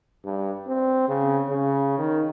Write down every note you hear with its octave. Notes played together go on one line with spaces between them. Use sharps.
G2
C4
C#3
C#3
D#3